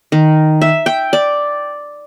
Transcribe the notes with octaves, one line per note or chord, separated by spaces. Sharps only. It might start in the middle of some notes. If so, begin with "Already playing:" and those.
D#3
E5
G5
D5